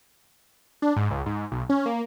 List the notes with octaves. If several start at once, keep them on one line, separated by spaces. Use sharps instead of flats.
D4
G#2
C#2
G#2
B1
C#4
A#3